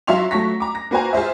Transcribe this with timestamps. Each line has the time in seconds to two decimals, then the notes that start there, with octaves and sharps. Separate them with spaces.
0.07 F#3 E5 F5 C6 F7
0.31 F#3 A3 C#6 A#6 B6
0.60 A#5 D6
0.75 A#6
0.91 A#3 F#4 B4 C5 G#5 A#5
1.13 F4 G#4 C5 E5